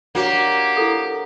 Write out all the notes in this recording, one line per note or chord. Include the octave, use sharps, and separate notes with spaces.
A#3 D4 F#4 G4 C#5
E4 A4